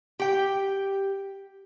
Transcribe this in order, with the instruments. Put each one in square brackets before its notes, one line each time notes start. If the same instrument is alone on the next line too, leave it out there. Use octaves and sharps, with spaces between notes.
[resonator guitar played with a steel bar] G4 G5